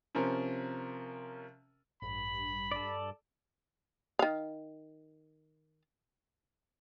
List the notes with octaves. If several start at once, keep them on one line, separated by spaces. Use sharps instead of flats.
C3 F3 C#4 A#4
A1 G2 B5
A4 D5
D#3 F5